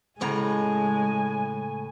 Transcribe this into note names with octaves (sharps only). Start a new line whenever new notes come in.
A2 C#3 G#3 G#5 A#5